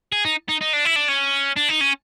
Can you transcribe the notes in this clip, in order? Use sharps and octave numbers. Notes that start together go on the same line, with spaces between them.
G#4
D#4
D#4
D#4
D4
E4
D4
C#4
D4
D#4
C#4